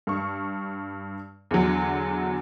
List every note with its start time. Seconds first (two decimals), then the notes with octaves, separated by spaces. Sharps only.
0.07 G2 C#6
1.51 E2 D3 F#3